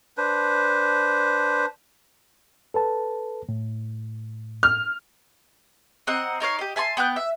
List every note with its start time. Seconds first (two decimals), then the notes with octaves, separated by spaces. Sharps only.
0.17 D4 B4 C5
2.74 A4 B4 A5
3.49 A2
4.63 F6
6.07 C4 D#5 F#5 A#5
6.40 D#4 A#4 C#5 F5
6.59 G4 D#5
6.76 E5 G#5 A5 C6
6.97 B3 G5 D6 F#6
7.16 E5